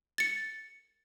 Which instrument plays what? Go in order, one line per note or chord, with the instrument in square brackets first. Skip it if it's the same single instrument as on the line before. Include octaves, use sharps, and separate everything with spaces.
[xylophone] A6 C#7